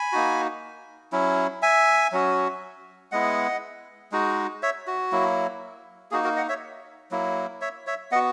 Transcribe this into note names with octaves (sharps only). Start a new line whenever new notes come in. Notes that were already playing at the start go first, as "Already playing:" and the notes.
Already playing: G#5 B5
A#3 D#4 F#4
F#3 C#4 E4
E5 G#5
F#3 C#4 F#4
G#3 B3 E4 D#5 F#5
G#3 D#4 F#4
C#5 E5
F#4
F#3 A#3 E4
A#3 D#4 F#4 G#4
F#4 A#4
D#5 F#5
C#5 E5
F#3 A#3 E4
C#5 E5
C#5 E5
B3 F#4 D#5 F#5